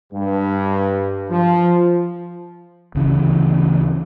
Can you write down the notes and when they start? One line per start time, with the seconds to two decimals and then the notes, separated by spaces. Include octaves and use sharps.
0.12 G2
1.30 F3
2.95 D2 C#3 E3